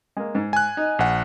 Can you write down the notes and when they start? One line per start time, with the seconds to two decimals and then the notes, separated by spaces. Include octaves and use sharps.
0.17 G#3 A#3
0.35 G#2
0.53 G#5 F#6
0.77 D#4
0.99 A#1 F#5 G#5